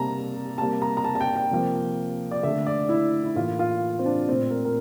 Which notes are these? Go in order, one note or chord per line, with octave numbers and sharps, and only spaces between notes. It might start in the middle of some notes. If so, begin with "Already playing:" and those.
Already playing: C3 G3 A#3 A5 A#5
C3 G3 A#3 A5
A#5
A#5
A5
A5
G5
G5
C3 F3 A#3
D5
D3 A3 E5
D5
E4
E4
A2 E3 A#3 F4
F4
C4
D4
A#2 A3 C4
A#4
A#4